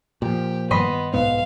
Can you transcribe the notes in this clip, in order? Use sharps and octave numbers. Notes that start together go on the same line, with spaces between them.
A#2 F3 G4
G2 D#3 G3 B3 D#5 B5 C6
B1 G#2 B3 F5